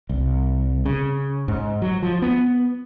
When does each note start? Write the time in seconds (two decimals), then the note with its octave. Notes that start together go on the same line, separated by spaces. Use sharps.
0.09 C2
0.85 C#3
1.48 G#2
1.82 F#3
2.03 F3
2.22 B3